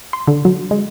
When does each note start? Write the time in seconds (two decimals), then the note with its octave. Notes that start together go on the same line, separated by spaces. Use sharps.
0.13 C6
0.27 D3
0.45 F#3
0.71 G#3